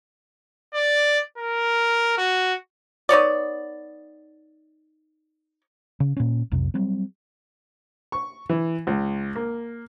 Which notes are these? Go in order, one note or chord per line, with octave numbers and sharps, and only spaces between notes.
D5
A#4
F#4
B3 D#4 C#5 D5
C#3
A#2 C#4
B1 F2 C3
F#3 G3 C4
C#6
E3
C#2
A#3